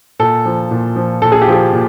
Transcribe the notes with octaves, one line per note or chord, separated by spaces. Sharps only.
A#2 A4
F3
A#2
F3
A#2 A4
G#4
G4
F3 G#4
A#2